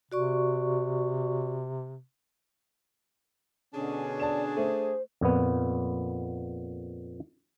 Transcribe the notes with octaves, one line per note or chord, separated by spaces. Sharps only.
C3 F#4 D5 C#6
B2 D3 C#4 D4 G#4
D5 A5 E7
A3 C5
F2 A#2 B3